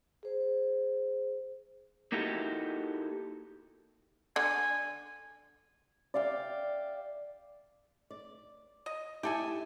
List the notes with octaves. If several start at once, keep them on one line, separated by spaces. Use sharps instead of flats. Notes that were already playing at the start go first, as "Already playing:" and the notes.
G#4 C5
A#3 D#4 E4 F#4 G4 A4
D3 G#5
D5 E5 F5 G5
D5
D#5
E4 G4 A4 G#5